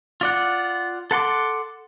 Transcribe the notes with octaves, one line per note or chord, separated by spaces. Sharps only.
F4 D5 F#5
A4 F#5 C6 D6